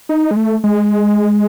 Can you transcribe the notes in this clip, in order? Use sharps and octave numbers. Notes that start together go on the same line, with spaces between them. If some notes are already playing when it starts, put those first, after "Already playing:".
D#4
G#3
A3
G#3